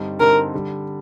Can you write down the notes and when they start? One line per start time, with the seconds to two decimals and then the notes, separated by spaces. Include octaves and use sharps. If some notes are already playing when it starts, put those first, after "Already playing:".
Already playing: G2 D3 G3 C4 D#4
0.20 G2 D3 G3 C4 D#4 A#4
0.54 D3 G3